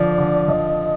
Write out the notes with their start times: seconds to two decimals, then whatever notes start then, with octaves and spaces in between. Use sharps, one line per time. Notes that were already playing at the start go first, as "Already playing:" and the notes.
Already playing: D3 F3 D5
0.18 D3
0.48 F3 D#5